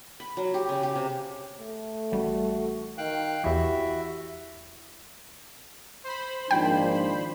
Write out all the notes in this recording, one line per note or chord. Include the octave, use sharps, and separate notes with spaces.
B5
F#3
G4
C#3
G4
C3
A3
A1 G3 F#4
D#3 F5 G5 F#6
E2 E3 E4 F#4 G4 E5
C5 B5
G#1 A#2 D#3 F3 D4 G5